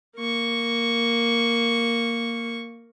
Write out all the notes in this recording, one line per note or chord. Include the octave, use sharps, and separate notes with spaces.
A#3 C#6